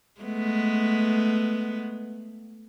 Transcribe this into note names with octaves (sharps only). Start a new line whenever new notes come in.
G#3 A3 B3